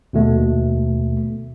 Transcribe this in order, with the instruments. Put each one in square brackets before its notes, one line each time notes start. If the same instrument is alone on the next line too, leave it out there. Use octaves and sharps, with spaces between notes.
[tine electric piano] D#2 B2 A3